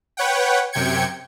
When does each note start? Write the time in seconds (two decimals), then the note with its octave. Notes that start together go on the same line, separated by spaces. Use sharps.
0.17 B4 C#5 F#5 G5
0.73 F#2 C3 G5 G#6 C#7